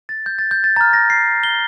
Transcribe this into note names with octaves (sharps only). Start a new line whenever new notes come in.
A6
G6
A6
G6
A6
A#5 F6 A6
A#6
C7
G7